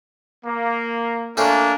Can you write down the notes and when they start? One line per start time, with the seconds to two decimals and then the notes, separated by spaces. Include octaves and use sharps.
0.45 A#3
1.37 A3 A#3 C#4 D4 F4